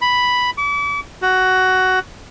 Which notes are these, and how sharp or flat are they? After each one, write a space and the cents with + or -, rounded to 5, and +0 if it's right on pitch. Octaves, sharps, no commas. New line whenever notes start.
B5 +0
D6 -40
F#4 +10